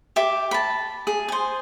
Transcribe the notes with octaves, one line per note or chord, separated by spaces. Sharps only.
G4 E5 D6
A5 B5
G#4
G#4 C5